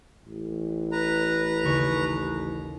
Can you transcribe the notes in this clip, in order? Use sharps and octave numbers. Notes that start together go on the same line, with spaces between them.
A1
B4 A#5
D#2 C#3 C#6